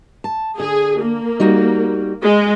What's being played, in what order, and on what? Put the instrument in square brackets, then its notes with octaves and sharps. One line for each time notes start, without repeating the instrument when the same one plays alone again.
[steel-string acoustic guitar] A5
[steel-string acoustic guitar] D3 [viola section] G#4
[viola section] A#3
[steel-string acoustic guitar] G3 D#4 F#4
[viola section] G#3